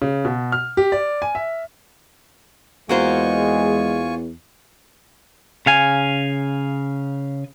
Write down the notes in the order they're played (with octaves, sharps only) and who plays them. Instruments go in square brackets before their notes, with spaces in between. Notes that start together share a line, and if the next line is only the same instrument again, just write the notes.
[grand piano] C#3
B2
F6
G4
D5
G#5
E5
[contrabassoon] E2 [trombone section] G#3 [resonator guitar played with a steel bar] A#3 F#4 C5 [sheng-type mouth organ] F4 G#5 C#6
[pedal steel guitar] C#3 F5 G#5